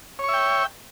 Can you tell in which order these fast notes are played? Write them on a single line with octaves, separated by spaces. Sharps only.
C#5 C#6 E5 G5